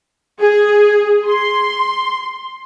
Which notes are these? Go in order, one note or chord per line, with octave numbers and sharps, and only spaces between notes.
G#4
C6